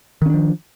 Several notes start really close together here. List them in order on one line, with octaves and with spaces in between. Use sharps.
D#3 C#4 D4 F3